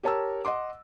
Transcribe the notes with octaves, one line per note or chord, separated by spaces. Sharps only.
G4 A#4 C#5 A5 A#5 E6
D#5 F#5 C6 D6